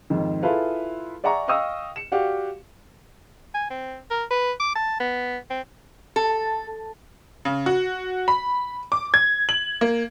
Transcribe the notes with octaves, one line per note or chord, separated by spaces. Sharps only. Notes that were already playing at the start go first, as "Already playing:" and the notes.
F2 G#2 D#3
E4 F4 G#4 A4 B4 F5
D5 E5 F#5 G#5 A#5 C#6
D#5 F5 G5 C#6 D#6 E6
C#7 E7
F#4 G4 D5 F5 F#5
G#5
C4
A#4
B4
D6
A5
B3
C4
A4
C#3
F#4
B5
D6
G#6
F#7
A#3